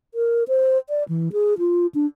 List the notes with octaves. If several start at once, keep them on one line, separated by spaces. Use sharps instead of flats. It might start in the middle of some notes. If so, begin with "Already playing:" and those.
A#4
C5
D5
E3
G#4
F4
D4